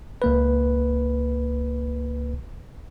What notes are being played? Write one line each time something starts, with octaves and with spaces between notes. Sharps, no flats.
C#2 A#3 B4